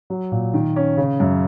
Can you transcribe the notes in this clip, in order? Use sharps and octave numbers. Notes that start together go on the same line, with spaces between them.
F#3
A#2
D#3
C#4
C#3
F#2